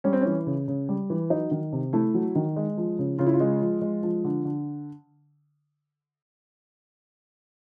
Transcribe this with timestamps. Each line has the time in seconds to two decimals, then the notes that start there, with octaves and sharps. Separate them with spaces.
0.04 G3 C#4
0.13 C4
0.21 C#4
0.26 E3
0.47 C#3
0.68 C#3
0.89 G3
1.10 E3
1.30 F#3 D#4
1.51 D#3
1.73 C3
1.93 A3 E4
2.14 F#3
2.35 D#3
2.56 G#3
2.77 F3
2.99 C#3
3.19 C#3 F4
3.26 E4
3.33 F4
3.40 G#3
3.61 F3
3.82 G#3
4.03 F3
4.24 D3
4.45 D3